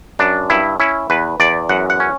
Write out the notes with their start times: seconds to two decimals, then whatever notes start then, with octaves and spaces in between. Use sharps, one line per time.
0.19 F#2 D4
0.50 G2 E4
0.80 C#4 E4
1.10 E2 B4
1.40 E2 D5
1.69 F#2 F#5
1.90 F#5
2.00 C#4